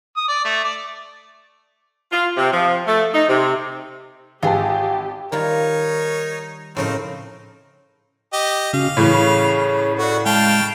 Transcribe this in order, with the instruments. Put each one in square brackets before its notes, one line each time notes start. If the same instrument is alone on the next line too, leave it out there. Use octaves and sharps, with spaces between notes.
[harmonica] D#6
D5
A3
D5
[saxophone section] F4
C3
F3
A3
D#4
C3
[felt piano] G#1 B4 A5 [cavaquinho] F4 G#4 [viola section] G4 [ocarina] G5
[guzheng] D#3 G3 F4 [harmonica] D#4 C#5 [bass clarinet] A#4
[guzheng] A2 C#3 A#4 [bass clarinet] F3 [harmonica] C4 D#4
[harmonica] G4 D#5
[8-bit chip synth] C#3 C#4 F#4 [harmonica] F5
[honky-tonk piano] A2 C#3 E3 [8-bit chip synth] G#4 C#5
[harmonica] F#4 [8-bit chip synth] A4 D5
[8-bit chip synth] G#3 [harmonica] F5 G5 A5